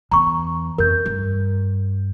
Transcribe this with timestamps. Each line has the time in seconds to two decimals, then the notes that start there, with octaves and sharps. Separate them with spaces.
0.11 E2 A#5 C#6
0.78 F2 A#4 G6
1.06 G2